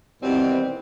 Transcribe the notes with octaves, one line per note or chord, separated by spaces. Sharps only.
B2 D#3 E3 G3 C4